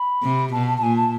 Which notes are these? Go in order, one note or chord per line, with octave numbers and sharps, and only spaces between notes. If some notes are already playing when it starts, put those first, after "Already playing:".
Already playing: B5
C3
B2 A5
A5
A5
A#2 G#5
A5